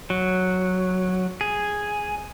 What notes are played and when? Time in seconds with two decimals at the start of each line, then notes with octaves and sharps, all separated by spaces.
0.10 F#3
1.41 G#4